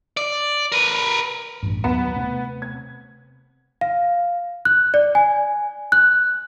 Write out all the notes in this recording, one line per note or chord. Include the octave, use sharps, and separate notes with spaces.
D5
A#4 B4
A1 G2
D#2 F#3 B3 B5 E7
C3 A3 C4
G#6
F5
F#6
D5
G#5
F#6